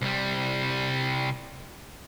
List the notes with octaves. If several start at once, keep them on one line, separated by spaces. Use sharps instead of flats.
C2 G3